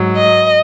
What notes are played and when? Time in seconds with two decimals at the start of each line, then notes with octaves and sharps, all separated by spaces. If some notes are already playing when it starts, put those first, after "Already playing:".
Already playing: G#2 F#3
0.16 D#5